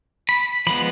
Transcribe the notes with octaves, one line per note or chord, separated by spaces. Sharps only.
B5
F3 G#3 B3 B5